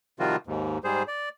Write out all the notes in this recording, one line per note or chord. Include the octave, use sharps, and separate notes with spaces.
C3 D#3 F3 G3 F4 F#4
D#2 G#2
G#2 G3 G#4 C5
D5